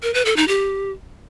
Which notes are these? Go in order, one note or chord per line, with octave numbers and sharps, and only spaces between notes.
A#4
B4
A4
D#4
G4